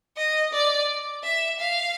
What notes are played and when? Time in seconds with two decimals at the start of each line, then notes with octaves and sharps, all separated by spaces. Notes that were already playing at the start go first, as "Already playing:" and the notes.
0.17 D#5
0.53 D5
1.23 E5
1.59 F5